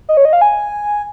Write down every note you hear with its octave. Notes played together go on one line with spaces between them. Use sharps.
D#5
C#5
D#5
F5
G#5